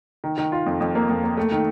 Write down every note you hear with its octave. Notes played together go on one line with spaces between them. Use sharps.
D#3
D#3
F4
F2
F2
A#3
F2
A#3
A3
D#3